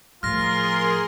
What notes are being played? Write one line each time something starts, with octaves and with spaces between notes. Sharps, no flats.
A2 F3 F4 G#4 A#4 C6 F6 A#6